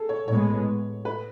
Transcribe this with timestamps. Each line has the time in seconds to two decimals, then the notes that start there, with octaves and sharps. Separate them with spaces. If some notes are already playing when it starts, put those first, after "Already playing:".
Already playing: G#4 A4
0.09 C#5
0.28 A2 G#3 B3 C#5
1.05 B4